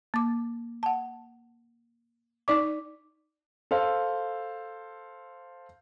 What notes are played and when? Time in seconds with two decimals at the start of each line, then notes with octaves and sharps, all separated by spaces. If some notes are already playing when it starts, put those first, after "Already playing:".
0.14 A#3 D6
0.83 F#5 A5
2.48 D#4 D5 D6
3.71 A4 C5 F5